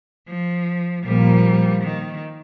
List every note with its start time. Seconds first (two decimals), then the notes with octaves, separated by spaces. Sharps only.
0.28 F3
1.05 A#2 F3 G3 A#3
1.83 D#3